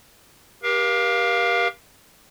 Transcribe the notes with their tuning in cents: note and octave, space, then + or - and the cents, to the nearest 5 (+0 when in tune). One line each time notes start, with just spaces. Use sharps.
G4 +0 A#4 +40 F5 +0